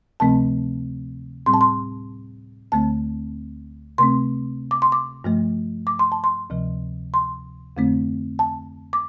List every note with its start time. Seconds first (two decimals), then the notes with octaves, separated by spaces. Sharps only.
0.20 D2 C3 F3 A3 C4 A5
1.46 A2 G3 C4 C6
1.54 A5
1.61 C6
2.72 D2 D3 A3 C4 A5
3.98 C3 A3 C4 C6
4.71 D6
4.82 C6
4.92 D6
5.24 G2 F3 A3
5.87 D6
5.99 C6
6.12 A5
6.24 C6
6.50 D2 C3 F3
7.14 C6
7.77 F2 D3 A3 C4
8.39 A5
8.93 D6